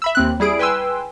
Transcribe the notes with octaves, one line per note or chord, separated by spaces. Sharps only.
E5 B5 E6
D#2 C4 F#6
G3 E4 G#4 D7
B4 G5 G#5 C6 E6